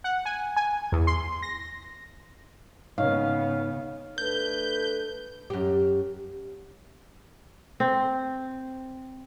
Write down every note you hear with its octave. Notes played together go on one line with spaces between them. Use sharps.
F#5
G#5
G#5
E2
C6
A#6
G#2 C#3 B3 D#4 C#5 F5
A3 D4 A4 B4 G6
F#2 G4
C4